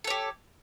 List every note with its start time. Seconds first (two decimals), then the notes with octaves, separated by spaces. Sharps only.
0.04 A4
0.07 C#5
0.10 G4